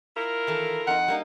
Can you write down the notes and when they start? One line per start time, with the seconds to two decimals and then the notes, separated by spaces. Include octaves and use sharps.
0.17 E4 F4 A#4
0.47 D#3 E3 A4
0.87 F2 D#4 F#5
1.08 G3 A#3 D#4